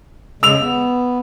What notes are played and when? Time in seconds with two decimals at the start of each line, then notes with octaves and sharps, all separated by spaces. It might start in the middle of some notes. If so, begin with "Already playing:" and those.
0.43 C#3 G#3 E6 F7
0.61 B3